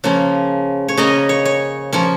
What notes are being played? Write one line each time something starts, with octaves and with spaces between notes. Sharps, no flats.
C#3 F3 A#3 C#4
C#5
C#3 A#3 C#4 D#5
C#5
C#5
F3 A#3 C#4